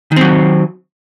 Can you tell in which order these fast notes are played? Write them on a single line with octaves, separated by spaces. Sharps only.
D#3 C4 F#3